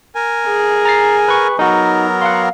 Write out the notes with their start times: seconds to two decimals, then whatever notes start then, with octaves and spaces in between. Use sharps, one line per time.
0.15 A#4 G#5
0.48 G#4
0.85 A#5 A6 C7
1.28 B4 C#6
1.59 F#3 B3 D#4 F#4 A#4
2.22 F5 F#5 C6